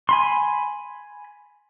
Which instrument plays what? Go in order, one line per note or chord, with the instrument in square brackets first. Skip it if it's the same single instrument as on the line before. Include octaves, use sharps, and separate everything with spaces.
[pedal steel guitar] G#5 B5 C6